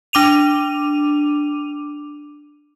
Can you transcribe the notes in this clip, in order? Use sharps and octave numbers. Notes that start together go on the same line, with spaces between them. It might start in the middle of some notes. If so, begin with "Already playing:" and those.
D4 D6 D#7 F7